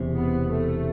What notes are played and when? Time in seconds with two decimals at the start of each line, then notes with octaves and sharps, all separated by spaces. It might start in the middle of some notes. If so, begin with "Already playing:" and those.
Already playing: E1 E2 C3
0.15 B3
0.50 A3